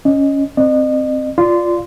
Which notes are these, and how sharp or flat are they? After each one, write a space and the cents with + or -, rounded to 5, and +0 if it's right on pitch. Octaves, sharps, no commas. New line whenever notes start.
C#4 +0 D#5 -5
C4 +0 D#5 -40
F4 +0 D5 +0 C6 -20